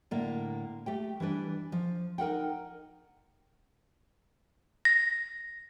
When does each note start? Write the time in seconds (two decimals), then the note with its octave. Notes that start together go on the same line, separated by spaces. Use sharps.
0.11 A2 D3 A#3 D5
0.86 A3 G4 G5
1.20 E3 G3 D4 B4
1.72 F3
2.18 D#4 A#4 F#5 G5
4.85 A#6